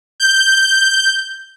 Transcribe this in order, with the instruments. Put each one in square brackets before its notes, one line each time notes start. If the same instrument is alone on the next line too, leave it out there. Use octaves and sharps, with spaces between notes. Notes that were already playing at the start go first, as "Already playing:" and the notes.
[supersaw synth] G6